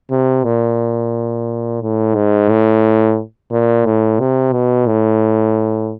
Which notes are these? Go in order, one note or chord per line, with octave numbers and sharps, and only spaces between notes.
C3
A#2
A2
G#2
A2
A#2
A2
C3
B2
A2